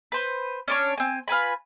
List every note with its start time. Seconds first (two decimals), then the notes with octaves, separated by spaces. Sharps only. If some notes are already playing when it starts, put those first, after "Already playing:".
0.12 B4 C5
0.68 C#4 D4 C#5
0.98 C4 G#5
1.28 F4 B4 G#5 B5